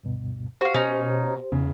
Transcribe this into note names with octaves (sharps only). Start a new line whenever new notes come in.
D2 G2 B2
F#4 G4 C5 F5
B2 C#4 D#4
E2 C#3